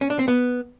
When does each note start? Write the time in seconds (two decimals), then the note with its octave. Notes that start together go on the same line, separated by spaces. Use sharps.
0.01 C#4
0.10 D4
0.19 C4
0.28 B3